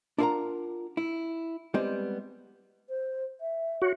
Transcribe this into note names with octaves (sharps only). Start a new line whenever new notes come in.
D4 E4 F4 A#4 F#5 A#5
E4
G3 G#3 B3 C4 G4
C5
E5
F#4 C#5